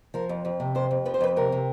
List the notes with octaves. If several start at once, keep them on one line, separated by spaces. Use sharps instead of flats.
F3 A#4
F2
F2
C3
F2 C5
F2
F3 B4
C5
F2 B4
C3 A#4
C3